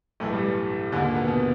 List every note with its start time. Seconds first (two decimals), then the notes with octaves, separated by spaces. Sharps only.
0.20 B1 A2 E3 A3
0.33 G2 G3
0.44 G2 G3
0.92 D#2 G#2 D3 G#3
1.04 A#2 A#3
1.15 B2 B3
1.27 B2 B3